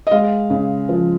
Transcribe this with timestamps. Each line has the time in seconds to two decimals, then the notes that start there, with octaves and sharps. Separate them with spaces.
0.07 D#5
0.11 G#3 F5
0.50 C#3
0.89 F3